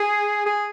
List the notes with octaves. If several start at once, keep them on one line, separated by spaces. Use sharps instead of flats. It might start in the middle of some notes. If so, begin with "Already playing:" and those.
Already playing: G#4
G#4